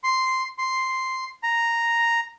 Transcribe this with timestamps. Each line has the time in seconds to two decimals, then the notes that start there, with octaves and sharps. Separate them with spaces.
0.04 C6
0.58 C6
1.43 A#5